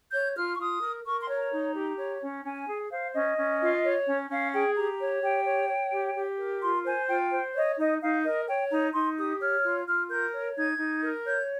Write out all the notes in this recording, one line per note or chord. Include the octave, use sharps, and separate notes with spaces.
C#5 G6
F4 F6
C#6
F4 D#6
A#4
A#4 C#6
C6
C#5
A#5
D#4
G4
C#5
C#4
C#4 G#5
G#4
C5 F5
C#4 D#5
C#4
F4
C#5
C#4
C#4 F5
G#4 G5
G4 A#5
C#5
G4 G5
C#5
C#5
G4
G4
A#4
F4 C6
C5 G#5
F4 G5
C5
C#5 D#5
D#4 D#5
D#4 F5
A#4 D#5
C#5 G5
D#4 A#5
D#4 C6
G4 D#6
C#5 F6
F4
F4 F6
A#4 G6
C#5
D#4 G#6
D#4
A#4
C#5 G6